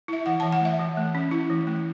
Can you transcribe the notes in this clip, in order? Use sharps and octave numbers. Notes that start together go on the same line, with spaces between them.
E4 E5
E3 F#5
A5
E3
F#5
A3 E5
E3
A3
C#4
E4
E3
A3